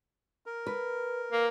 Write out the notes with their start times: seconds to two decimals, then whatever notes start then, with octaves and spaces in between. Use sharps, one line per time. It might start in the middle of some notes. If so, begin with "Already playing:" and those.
0.46 A#4
0.67 B4
1.32 A#3